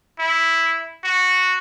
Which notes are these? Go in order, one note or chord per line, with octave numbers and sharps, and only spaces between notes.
E4
F#4